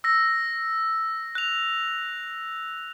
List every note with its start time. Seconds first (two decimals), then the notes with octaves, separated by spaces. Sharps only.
0.04 E6 A#6
1.35 F#6 F7